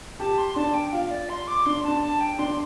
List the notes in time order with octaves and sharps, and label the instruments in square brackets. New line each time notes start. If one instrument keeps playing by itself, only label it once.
[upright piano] G4 [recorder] A5
[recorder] C6
[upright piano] D4 [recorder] A5
[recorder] G5
[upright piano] F4 [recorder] F5
[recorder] D5
C6
D6
[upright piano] D4 [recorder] C6
[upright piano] D4 [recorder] A5
[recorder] A5
G5
[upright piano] D4 [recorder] C6